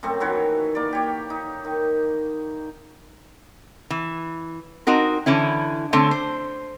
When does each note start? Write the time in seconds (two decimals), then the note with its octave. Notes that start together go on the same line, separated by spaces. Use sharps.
0.03 F#2 A3 C4 C#6
0.20 D#3 E3 F#4 C#5
0.75 A#3 D5
0.93 G4 C#5
1.30 D#4
1.65 D#3
3.90 E3
4.87 C4 D#4 F#4 A#4
5.26 D3 E3 C#4 E4
5.93 D3 A3 C4 C#5
6.11 C5